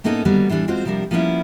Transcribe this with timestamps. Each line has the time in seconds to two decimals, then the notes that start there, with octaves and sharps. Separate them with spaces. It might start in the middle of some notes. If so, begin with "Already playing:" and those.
0.04 A2 A#3 B3 C#4 D#4 A4
0.25 D3 D#3 F#3 G3 A#3 B3
0.49 A2 E3 G3 D4
0.68 G#3 C4 F4 F#4 C5
0.85 C3 F3 G3 D4 A#4
1.11 F3 A#3 B3 C#4 E4